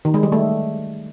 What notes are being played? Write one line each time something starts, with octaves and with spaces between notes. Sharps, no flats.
D#3
G#3
G3
A3